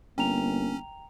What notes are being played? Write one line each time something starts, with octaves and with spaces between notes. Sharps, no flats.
G1 A#3 C#4 G5 A#5 F7